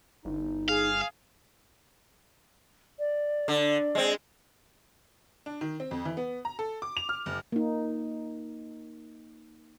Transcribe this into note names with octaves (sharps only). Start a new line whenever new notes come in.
G1 D#4
G#4 F5
D5
D3
G#3 C4
D4
D#3
C4
F2
E3
B3
A#5
A4
D6
F7
F6
F#1
A#3 D#4